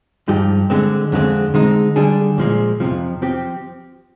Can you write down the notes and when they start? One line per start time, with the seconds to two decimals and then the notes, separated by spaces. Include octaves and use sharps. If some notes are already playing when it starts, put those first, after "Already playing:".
0.28 G2 F3 G#3 D#4 G4
0.70 D3 G#3 C4
1.12 F2 D3 G#3 C4
1.54 D3 G#3 C4 D#4
1.96 D3 G3 D4 G#4
2.38 A#2 F3 G#3
2.80 F2 C3 F3
3.22 F3 C4 G4